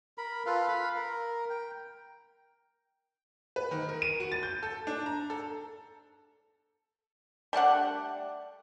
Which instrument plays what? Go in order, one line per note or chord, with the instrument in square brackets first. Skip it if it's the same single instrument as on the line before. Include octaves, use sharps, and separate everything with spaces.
[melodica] A#4 B5
F4 A4 B4 F5
F5 B5
A#4
G5
[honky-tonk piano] B4
D#3
A#4
D#7
F#4
A6
G6
A4
D4
A#5
A4
[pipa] G3 A3 D4 F#5